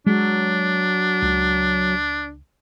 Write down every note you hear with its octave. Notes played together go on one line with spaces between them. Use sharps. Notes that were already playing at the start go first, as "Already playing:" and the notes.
F#3 G#3 D4
C#2